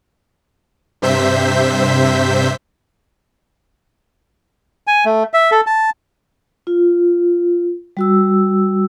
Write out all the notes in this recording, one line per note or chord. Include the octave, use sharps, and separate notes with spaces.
G2 C3 C5 E5 G6 B6
G#5
A3
E5
A4
A5
F4
G3 F#4 E6